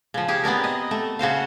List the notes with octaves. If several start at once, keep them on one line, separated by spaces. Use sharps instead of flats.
C#3 F3
C#4 G4 G#4
B3 C4 D4 A#4
D#5
A3
C#3 F#4 C5 F5